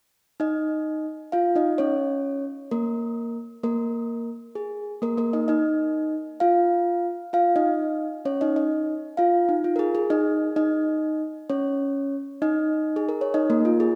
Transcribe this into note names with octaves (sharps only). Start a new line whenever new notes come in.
D#4 D#5
F4 F5
D#4 D#5
C#4 C#5
A#3 A#4
A#3 A#4
G#4
A#3 A#4
A#3 A#4
D#4 D#5
D#4 D#5
F4 F5
F4 F5
D#4 D#5
C#4 C#5
D#4 D#5
D#4 D#5
F4 F5
D#4
F4
A#4
G#4
G#4
D#4 D#5
D#4 D#5
C#4 C#5
D#4 D#5
G#4
A#4
C#5
D#4 D#5
A#3 A#4
F4
G#4